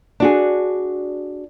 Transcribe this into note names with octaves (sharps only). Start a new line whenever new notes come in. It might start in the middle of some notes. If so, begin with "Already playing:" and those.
D4 F#4 G#4